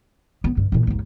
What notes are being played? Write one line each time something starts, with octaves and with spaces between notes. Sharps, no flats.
B3
G2
A#2 E3
G#1 D#2